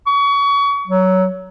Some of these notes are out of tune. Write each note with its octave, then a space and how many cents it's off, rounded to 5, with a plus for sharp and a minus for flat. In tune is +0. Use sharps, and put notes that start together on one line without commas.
C#6 +30
F#3 +15